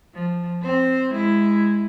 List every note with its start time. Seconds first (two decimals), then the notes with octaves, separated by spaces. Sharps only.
0.14 F3
0.62 C4 C5
1.11 G#3 E4